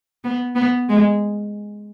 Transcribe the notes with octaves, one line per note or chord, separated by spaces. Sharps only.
B3
B3
G#3